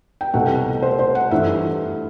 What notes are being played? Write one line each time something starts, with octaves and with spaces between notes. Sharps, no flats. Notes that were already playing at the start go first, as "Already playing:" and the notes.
G5
C2 B2 A3 C4 F#5
C5
C5
F#5
G2 E3 A3 E5